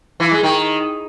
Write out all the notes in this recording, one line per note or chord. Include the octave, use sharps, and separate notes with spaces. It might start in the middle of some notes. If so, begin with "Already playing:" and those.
E3
G#3
D#3